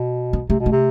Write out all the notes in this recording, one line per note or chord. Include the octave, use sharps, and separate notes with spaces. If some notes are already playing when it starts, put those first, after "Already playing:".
Already playing: B2
B3
C3 A3
B2
A3
C3